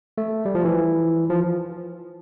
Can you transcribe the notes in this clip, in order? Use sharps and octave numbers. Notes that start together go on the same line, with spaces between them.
A3
G3
F3
E3
F3